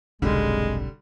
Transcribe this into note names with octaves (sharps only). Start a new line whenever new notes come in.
F1 B1 G#2 D3 G3 G#3 C4